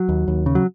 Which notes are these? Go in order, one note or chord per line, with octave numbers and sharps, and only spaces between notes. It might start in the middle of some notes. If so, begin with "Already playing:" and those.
Already playing: F#3
D#2
D#2
C#3
F#3